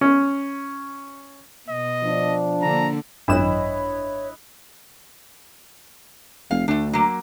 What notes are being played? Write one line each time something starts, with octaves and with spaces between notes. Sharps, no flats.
C#4
B2 D#5
F3 D4
D3 A#3 A#5
G#1 F#2 D4 E4 B4 C#5 D#5 E7
F1 F5
D2 A3 D4
F#3 A#3